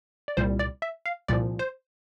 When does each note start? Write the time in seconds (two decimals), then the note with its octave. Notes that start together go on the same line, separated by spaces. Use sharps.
0.28 D5
0.37 C2 A#2 G3 C5
0.59 D5
0.82 E5
1.06 F5
1.28 C2 A#2 F3 D5
1.59 C5